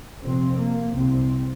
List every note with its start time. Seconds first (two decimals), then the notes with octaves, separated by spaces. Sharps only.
0.21 F2 C3 C4
0.57 A#3
0.94 C2 C3 C4